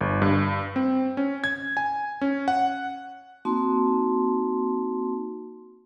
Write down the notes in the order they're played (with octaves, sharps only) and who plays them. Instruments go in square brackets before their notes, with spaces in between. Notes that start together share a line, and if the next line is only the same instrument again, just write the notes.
[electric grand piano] G1
G2
C4
C#4
G#6
G#5
C#4
F#5
[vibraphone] A#3 C4 D#4 F#4 A5 C6